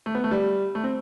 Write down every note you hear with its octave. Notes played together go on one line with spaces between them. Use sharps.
A3
B3
A3
G3
A3
C4